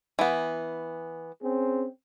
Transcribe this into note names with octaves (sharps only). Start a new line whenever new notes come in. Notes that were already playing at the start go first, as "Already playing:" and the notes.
E3 B3
C4 C#4 G#4